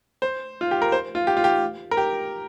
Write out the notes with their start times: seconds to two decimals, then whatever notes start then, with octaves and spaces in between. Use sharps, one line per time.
0.22 C5
0.61 F4
0.71 G4
0.82 A#4
0.92 C5
1.15 F4
1.27 G4
1.37 F4
1.44 G4
1.91 A#4
1.97 G4